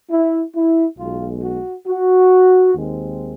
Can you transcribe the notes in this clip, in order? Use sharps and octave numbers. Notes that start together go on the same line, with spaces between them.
E4
E4
B1 B2 G#3 F4
F#4
F#4
D#2 D#3 G#3 C4